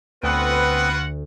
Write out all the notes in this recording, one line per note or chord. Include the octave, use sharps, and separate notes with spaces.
D2 B3 C4 F4 F#4 B4 F#5